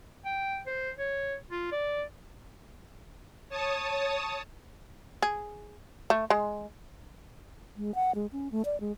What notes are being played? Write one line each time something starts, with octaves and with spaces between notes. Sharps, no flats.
G5
C5
C#5
F4
D5
C#5 A5 D#6
G#4
A3
G#3
G#3
F#5
G#3
C#4
A3
D5
G#3